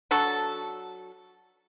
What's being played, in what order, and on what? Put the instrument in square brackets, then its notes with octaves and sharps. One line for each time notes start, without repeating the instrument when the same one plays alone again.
[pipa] F#3 D4 F#4 A4